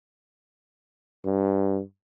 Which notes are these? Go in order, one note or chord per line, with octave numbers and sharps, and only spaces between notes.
G2